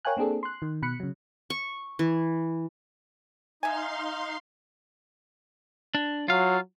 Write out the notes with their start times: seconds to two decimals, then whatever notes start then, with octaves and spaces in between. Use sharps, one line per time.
0.05 A#4 C#5 F5 G5 G#5 F#6
0.17 A#3 C4 D4 G#4 A4
0.43 C6 F#6
0.62 D#3
0.82 B2 B5 F#6 C#7
1.00 C#3 F#3
1.50 C#6
1.99 E3
3.63 D#4 E5 F5 G#5 C6
5.95 D4
6.28 F#3 F4 F5